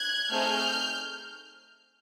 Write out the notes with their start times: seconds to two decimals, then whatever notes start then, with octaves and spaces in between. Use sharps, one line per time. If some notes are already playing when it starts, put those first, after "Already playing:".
Already playing: F#6 G#6
0.30 A3 C4 D#4 G#4 F6 G6